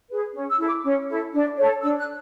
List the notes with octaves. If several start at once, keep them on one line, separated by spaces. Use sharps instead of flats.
G#4 B4
C#4
E6
E4 A4
D6
C#4
E4 A4
D4
A4 C#5
D4 E6
F#6